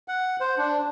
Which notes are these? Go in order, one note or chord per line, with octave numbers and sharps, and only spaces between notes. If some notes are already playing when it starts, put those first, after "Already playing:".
F#5
C5
D4